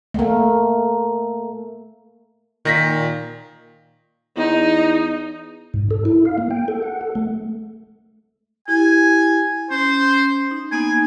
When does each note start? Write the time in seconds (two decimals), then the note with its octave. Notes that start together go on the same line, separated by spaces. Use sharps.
0.14 A3 A#3
2.65 A#2 D#3 A#6 B6
4.37 E2 D#4
5.74 G#2
5.91 A4
6.05 E4
6.25 F5
6.38 A#3
6.51 G5
6.68 A4
6.83 F#5
7.01 A4
7.15 A3
8.68 E4 G4 G#5
9.70 C#4 C5
10.51 D#4
10.72 A#3 B3 D#4 G#5